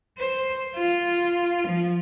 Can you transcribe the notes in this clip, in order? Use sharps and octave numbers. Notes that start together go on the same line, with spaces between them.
C5
F4
F3